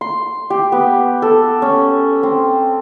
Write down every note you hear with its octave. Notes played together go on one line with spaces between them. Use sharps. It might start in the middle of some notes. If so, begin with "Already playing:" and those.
C6
G4
B3
A4
C#4
C4